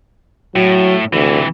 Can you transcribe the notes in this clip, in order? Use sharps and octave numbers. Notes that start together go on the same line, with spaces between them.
A2 F#3
D2 C3 E3